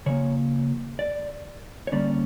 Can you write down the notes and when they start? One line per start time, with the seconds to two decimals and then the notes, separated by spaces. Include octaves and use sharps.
0.06 C#3 F3 A#3 C#5
0.99 D5
1.87 C#5
1.92 D3 G3 A#3 C#4 D5